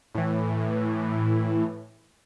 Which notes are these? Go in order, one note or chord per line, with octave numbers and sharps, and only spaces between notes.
A2 E3